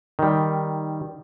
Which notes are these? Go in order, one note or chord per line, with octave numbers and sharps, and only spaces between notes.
D#3 G3